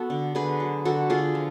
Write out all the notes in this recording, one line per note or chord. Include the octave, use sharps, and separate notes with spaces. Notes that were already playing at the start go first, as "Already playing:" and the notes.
Already playing: B3 F#4 A4
D3
D3 G#4 B4
F#3
D3 F#4 A4
D3 F4 G#4
F3